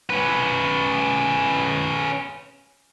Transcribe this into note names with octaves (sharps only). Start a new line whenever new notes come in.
C#4 B4